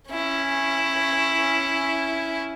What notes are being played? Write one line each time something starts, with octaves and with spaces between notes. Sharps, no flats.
C#4 E4